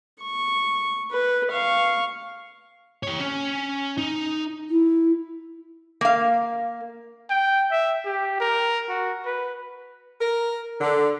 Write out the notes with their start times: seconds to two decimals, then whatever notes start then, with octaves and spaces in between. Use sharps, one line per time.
0.22 C#6
1.12 B4
1.52 F5 C#6
3.03 G4 C#5
3.20 C#4
3.97 D#4
4.69 E4
6.01 A#3 F5
7.30 G5
7.71 E5
8.05 G4
8.40 A#4
8.89 F#4
9.26 B4
10.21 A#4
10.81 D3